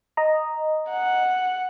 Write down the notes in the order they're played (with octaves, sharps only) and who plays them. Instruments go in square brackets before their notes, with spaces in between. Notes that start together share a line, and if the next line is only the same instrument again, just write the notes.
[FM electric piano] D#5 A#5
[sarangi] F#5